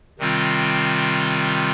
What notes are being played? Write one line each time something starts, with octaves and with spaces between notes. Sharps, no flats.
C3 D#3 G3 C4 F4